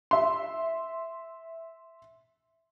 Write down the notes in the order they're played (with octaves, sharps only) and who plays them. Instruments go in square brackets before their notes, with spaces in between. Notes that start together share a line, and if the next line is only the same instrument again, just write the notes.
[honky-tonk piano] E5 C6